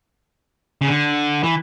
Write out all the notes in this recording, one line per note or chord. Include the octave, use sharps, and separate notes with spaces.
C#3
D3
E3